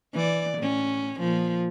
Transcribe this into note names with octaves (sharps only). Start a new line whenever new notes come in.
E3 D5
A2 C#4
A#2 F3